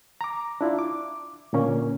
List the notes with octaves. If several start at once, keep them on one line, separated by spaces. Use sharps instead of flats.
A#5 D6
D4 E4 F4
D6
A#2 D3 A#3 C#4 A#4